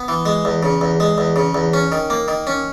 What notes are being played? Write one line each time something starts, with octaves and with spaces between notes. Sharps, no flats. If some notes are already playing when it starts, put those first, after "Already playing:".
Already playing: B3
E3
G#3
E2
C#3
E2
G#3
E2
C#3
E2
C#4
D#3
A#3
D#3
C#4